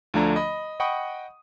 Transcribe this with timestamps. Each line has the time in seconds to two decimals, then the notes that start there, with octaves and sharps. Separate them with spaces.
0.14 D2 D3 F3 A3 D4 A#5
0.36 D#5 B5
0.80 D#5 F#5 G5 B5 C#6 D#6